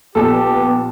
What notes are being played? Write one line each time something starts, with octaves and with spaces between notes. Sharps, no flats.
A#1 B3 G4 A4 A5